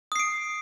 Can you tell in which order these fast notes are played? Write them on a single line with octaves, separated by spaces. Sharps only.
D#6 C7 D7